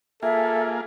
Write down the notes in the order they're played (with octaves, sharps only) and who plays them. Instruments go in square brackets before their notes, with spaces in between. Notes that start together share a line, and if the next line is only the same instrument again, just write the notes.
[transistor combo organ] A#3 F4 G#4 [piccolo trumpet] A4 [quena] E5